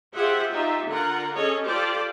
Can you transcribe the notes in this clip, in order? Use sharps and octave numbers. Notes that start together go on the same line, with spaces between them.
F4 G4 G#4 C5 E5 F#5
D#4 F4 G4 E5
D3 F4 A#4 F#5
C#4 G#4 A4 C#5 D#5
F4 G4 A4 C5 D5